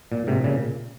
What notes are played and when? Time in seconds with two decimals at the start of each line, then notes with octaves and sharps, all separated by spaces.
0.12 A#2
0.27 G#2 C3
0.44 A#2 C#3